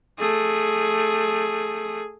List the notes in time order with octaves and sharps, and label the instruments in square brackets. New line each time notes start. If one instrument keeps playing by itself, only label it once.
[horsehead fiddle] A3 G#4